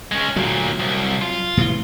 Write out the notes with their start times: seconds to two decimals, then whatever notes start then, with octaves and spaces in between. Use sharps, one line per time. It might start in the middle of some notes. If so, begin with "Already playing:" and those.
0.12 G#3 C#4
0.36 D2 A#2 F#3
0.79 C2
1.22 F4
1.57 A2 C3 E3